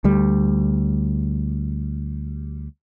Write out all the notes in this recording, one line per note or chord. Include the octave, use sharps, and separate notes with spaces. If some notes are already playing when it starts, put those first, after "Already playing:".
D2 G3